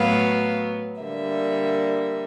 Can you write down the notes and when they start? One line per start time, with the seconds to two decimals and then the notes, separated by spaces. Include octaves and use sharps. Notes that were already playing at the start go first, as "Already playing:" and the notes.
Already playing: A2 F#3 B3 F5
1.01 D3 G3 A#3 E5